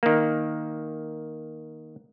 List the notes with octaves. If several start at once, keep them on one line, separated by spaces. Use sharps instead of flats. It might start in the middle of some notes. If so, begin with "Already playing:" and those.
D#3 A#3